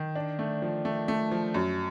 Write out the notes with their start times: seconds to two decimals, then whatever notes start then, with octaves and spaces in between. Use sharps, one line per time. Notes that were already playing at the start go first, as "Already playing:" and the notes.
Already playing: D#3
0.16 D4
0.39 A3
0.62 F3
0.85 A3
1.08 A3
1.31 F3
1.54 F#2